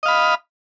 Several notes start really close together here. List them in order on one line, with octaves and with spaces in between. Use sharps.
D#5 F5 B5